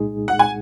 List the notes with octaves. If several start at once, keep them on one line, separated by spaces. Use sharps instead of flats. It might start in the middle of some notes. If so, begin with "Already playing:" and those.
Already playing: C2 A#2 G#3 D#4 G#4
F#5
G#5